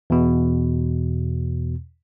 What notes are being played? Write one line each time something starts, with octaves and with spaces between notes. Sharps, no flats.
E2 B2